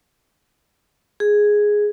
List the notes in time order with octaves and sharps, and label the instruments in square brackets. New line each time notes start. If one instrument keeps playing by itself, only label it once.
[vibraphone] G#4